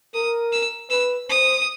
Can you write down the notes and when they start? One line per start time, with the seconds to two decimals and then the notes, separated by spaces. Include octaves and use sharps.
0.14 A#4 D#6
0.52 E6
0.90 B4 E6
1.29 C5 D#6